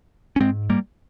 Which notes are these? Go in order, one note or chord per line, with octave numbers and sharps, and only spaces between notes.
C#4
G#2 G#3 C4
G3 A#3